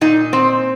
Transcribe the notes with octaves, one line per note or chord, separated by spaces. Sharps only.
A#2 D#4
C4